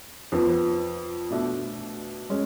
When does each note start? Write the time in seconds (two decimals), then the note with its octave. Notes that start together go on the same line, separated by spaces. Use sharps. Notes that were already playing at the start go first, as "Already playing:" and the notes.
0.32 F2 F3 B3
1.30 B2 A3 D4
2.30 G#3 C#4